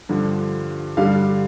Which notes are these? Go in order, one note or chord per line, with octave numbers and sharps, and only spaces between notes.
G2 D3 F3
G2 D3 G3 F5